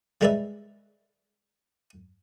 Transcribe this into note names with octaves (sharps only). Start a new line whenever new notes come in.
G3 G#3 A#4 B4 D5 E5